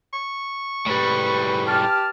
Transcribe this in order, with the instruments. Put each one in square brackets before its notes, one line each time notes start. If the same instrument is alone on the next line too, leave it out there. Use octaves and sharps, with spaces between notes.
[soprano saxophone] C#6
[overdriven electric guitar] A2 G3 [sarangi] B4
[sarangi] G4 [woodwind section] A5 F6